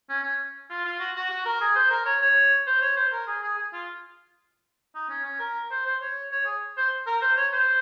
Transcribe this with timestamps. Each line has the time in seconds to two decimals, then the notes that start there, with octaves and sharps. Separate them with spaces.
0.09 C#4
0.23 C#4
0.70 F4
0.85 F4
1.00 F#4
1.15 F#4
1.30 F#4
1.45 A#4
1.61 G#4
1.76 C5
1.90 A#4
2.06 C#5
2.22 C#5
2.67 C5
2.82 C#5
2.97 C5
3.12 A#4
3.27 G#4
3.43 G#4
3.58 G#4
3.73 F4
4.95 D#4
5.09 C#4
5.25 C#4
5.39 A#4
5.71 C5
5.86 C5
6.01 C#5
6.31 C#5
6.46 G#4
6.77 C5
7.07 A#4
7.22 C5
7.37 C#5
7.53 C5